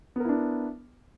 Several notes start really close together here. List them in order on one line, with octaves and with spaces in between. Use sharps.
B3 A#4 E4 D4